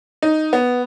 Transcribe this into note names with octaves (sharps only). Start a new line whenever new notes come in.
D#4
B3